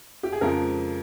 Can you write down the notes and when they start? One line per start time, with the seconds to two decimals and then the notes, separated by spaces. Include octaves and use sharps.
0.23 G4
0.32 G#4
0.41 F2 C#3 F3 G#3 A#4